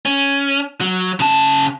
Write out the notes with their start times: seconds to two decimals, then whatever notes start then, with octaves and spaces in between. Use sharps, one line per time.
0.06 C#4
0.81 F#3
1.20 C#3 A5